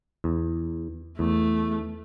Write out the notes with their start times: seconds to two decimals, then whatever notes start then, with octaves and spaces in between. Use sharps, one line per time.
0.24 E2
1.19 E2 A3